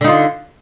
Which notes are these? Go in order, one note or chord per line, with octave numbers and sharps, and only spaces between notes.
D3 D#4 F4